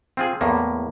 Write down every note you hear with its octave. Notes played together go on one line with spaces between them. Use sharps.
C4 F4 G#4
E2 A2 A#3